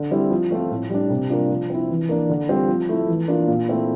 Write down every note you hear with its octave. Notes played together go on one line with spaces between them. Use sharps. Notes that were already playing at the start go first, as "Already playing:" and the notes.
Already playing: D3
G3 C4 E4
F3
A3 C4 F4
A2
G3 D4
C3
G3 A#3 D4 F4
F3
C4 E4
E3
A#3 D4
D3
G3 C4 F4
F3
A3 E4
E3
A#3 D4 F4
A#2
A3 C4 E4